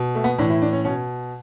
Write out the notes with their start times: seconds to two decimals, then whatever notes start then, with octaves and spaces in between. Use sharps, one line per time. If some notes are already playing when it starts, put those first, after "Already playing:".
Already playing: B2
0.15 A3
0.24 B3
0.38 A2 E3 D4
0.50 E4
0.62 D4
0.73 C#4
0.85 B2 C#4